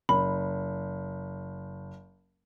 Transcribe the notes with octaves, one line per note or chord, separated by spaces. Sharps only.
F#1 B5